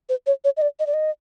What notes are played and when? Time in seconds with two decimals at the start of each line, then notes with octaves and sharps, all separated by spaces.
0.09 C5
0.26 C#5
0.44 C#5
0.57 D#5
0.62 D5
0.79 D#5
0.87 D5
0.94 D#5